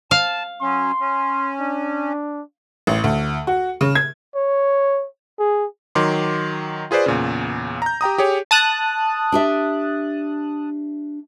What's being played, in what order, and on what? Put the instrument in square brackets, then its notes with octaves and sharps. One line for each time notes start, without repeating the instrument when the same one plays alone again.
[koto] F5 [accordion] A5
[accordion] F#3 C#4 [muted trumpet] C6
[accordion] C#4
[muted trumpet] D4
[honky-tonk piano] A1
D2
F#4
C#3
G#6
[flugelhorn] C#5
G#4
[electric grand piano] D#3 F#3 C6 D6
F4 G#4 B4 C5 D5
E2 A#2 C#3
A#5 G6
G4 G5 A#5 D#6
G4 G#4 C#5
[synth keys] A5 D#6 F#6
[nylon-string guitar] D4 G4 E5